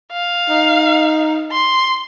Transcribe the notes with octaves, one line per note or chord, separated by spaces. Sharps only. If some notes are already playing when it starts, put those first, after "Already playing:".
F5
D#4
C6